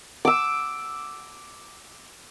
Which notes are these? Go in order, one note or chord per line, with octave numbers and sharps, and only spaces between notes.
D6 E6